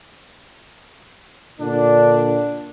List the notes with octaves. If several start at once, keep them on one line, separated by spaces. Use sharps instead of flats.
A#2 D3 D4